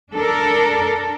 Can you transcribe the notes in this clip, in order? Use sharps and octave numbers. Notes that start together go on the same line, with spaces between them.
D4 A4 A#4